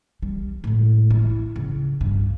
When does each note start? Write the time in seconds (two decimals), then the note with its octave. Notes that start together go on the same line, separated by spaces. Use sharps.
0.22 G3
0.64 A2 G#3
1.11 E4
1.56 C#3
2.01 G2